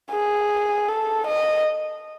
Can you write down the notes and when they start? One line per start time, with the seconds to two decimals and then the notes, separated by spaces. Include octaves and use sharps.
0.11 G#4
0.89 A4
1.27 D#5